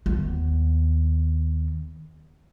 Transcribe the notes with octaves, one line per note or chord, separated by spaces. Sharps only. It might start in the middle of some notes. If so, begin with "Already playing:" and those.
D#2 B3